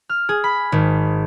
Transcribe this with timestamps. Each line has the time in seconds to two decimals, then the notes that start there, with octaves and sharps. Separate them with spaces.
0.09 F6
0.29 G#4
0.44 B5
0.72 G#1